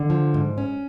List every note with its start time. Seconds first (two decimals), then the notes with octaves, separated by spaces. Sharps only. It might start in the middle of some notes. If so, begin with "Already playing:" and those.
Already playing: D3
0.10 F3
0.34 G#2
0.58 C#4